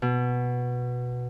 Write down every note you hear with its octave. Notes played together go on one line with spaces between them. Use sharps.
B2